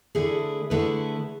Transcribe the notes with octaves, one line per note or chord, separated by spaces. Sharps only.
D3 A3 E4 G#4 B4
D3 A3 E4 G#4 B4